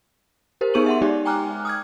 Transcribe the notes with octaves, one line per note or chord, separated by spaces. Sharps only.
G4 A#4 C5
B3 D#4 G#4 C#6 D#7 F#7
E5 F#5 C6
G#3 D#4 G4 D5
G5 G#5 A#5 D6 F6 F#6
D#6 F6 G#6